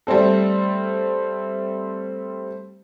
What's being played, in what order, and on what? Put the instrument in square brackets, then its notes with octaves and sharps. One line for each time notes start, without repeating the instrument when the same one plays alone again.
[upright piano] G3 A3 C4 A4